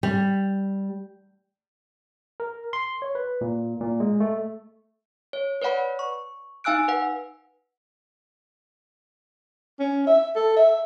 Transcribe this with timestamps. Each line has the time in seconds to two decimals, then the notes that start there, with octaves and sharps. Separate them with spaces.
0.03 G3
2.40 A#4
2.73 C6
3.02 C#5
3.15 B4
3.41 A#2
3.81 A#2
4.00 G#3
4.20 A3
5.33 C#5
5.62 B4 C#5 D5 F#5 B5
5.99 C#6
6.64 D#4 F5 G#5 E6 F#6 D7
6.88 B4 F#5
9.80 C#4
10.07 E5
10.36 A4
10.56 E5